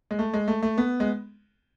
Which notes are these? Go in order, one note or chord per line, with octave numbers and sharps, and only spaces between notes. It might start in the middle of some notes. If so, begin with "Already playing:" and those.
G#3
A3
G#3
A3
A3
B3
G#3